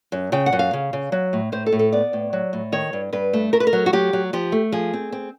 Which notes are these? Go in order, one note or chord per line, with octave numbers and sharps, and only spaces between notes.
F#2
C#3 G5
F#5
F#2
F5
C#3
C#3
F#3
A2
A2 C5
A4
A2
A4
B3 D5
A2
F#3
A2
D#3 C#5
G2
G2 B4
A3
A3 A#4
B4
A#4
F#3
F#4
F#3 G4
F#3
F3 G4
A3
F3 G#4
C4
C4